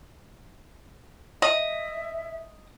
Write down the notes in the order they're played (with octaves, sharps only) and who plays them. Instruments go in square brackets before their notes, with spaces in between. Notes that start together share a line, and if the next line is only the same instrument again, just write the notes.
[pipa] D#5 [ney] E5